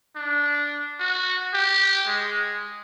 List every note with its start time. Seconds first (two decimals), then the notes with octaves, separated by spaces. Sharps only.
0.16 D4
1.00 F#4
1.54 G4
2.07 G#3